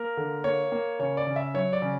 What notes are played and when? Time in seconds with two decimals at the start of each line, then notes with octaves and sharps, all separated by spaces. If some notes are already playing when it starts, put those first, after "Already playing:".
Already playing: A#3 A#4
0.17 D3
0.44 A#3 C#5
0.72 A#3
0.99 C#3 C#5
1.17 D5
1.27 C#3
1.36 E5
1.54 F#3 C#5
1.73 D5
1.82 C#3